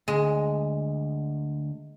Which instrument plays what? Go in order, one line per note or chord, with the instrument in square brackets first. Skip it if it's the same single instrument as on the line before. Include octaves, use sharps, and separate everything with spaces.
[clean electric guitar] D2 [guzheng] G#3